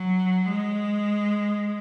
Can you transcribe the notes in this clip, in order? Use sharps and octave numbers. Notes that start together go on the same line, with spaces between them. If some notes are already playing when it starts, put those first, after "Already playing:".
Already playing: F#3
G#3